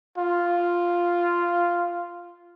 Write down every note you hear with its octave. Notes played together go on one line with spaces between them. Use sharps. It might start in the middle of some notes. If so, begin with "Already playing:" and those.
F4